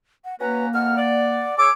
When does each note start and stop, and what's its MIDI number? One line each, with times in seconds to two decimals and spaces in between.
0.25 0.35 78
0.40 1.47 58
0.40 0.68 61
0.40 0.68 66
0.40 0.66 71
0.40 0.68 82
0.73 0.95 41
0.73 1.55 78
0.73 0.95 89
0.98 1.55 74
1.58 1.69 68
1.58 1.69 73
1.58 1.72 86
1.58 1.70 88